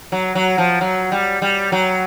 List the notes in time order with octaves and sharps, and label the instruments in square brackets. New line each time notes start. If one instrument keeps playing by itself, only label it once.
[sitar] F#3
F#3
F3
F#3
G3
G3
F#3